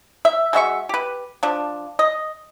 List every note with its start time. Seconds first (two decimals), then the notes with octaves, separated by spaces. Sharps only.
0.25 E5
0.53 G#3 F#4 E5 C#6
0.89 G4 B4
1.43 F3 D4
1.99 D#5